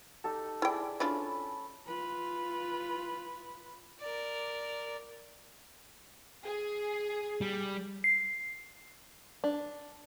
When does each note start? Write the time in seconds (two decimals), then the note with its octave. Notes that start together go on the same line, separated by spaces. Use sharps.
0.24 D#4 G4 A4
0.62 E4 G#4 D5 E5 G5
1.00 C#4 D4 E4 F4 A4 B5
1.86 F4 B4
4.00 A#4 D5
6.44 G#4
7.41 G3
8.04 C7
9.44 D4